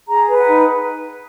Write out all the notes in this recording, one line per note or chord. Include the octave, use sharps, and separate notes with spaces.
G#4 A#5
B4
F#5
D#4